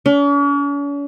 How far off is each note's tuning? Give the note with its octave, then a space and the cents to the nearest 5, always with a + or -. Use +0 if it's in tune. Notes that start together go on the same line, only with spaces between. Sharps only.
C#4 +45